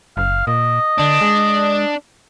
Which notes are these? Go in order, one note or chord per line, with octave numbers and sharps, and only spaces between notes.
F#1 F5
A#2 D#5
D3 D4
G#3